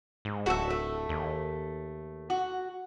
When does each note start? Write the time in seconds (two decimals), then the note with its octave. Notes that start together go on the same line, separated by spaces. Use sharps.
0.25 G#2
0.46 D1 F#4 A4 E5
0.70 A3
1.09 D#2
2.30 F#4